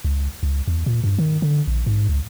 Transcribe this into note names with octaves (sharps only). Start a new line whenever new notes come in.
C#2
C#2
E2
A#2
G2
D#3
D3
A#1
G#2
C#2